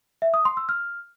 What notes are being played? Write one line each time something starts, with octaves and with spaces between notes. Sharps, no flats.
E5
D#6
C6
E6
F6